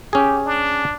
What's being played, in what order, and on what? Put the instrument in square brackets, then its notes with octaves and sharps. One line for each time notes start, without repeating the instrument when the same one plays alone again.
[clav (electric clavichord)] C#4 G#4 [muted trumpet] G4
[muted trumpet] D4